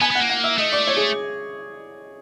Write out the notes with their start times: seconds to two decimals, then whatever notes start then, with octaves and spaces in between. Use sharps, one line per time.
0.01 B3 G#5
0.11 B3
0.15 F#5
0.20 A#3
0.29 F#5
0.44 E5
0.58 A3 D#5
0.73 D5
0.87 C#5
0.97 G#4